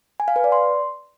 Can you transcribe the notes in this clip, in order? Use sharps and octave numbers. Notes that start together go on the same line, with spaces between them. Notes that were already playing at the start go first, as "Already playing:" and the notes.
G#5
F5
B4
D5
C6